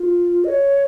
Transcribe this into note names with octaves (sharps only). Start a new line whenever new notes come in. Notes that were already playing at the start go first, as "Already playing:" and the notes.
Already playing: F4
D#5
C#5